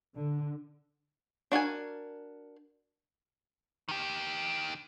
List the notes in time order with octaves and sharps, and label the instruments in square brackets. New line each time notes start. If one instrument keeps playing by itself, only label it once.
[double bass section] D3
[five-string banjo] D4 F#4 A#4 G#5
[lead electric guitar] D#3 G4